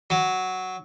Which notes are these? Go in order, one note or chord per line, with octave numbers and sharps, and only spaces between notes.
F#3